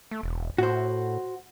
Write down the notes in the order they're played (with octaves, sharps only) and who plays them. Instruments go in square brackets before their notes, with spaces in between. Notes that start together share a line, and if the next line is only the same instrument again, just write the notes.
[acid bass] A3
E1
[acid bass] A2 [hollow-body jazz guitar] F#4 C5